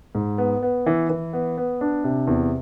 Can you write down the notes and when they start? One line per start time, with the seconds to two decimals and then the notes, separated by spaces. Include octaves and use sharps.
0.15 G#2
0.38 B3
0.63 B3
0.86 E3
1.10 E3
1.33 B3
1.58 B3
1.81 D4
2.04 C3
2.27 E2